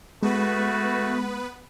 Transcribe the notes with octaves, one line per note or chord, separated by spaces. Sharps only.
G#3 A3 B3 F#4 B4